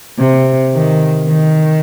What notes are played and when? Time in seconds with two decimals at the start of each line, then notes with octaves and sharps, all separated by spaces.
0.18 C3
0.73 D#3
1.27 D#3